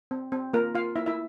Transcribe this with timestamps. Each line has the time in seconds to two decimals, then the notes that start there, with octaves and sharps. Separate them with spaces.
0.11 C4
0.32 C4
0.53 A#3 F4 A#4
0.75 F4 F5
0.96 A#3 E4 E5
1.06 E4 E5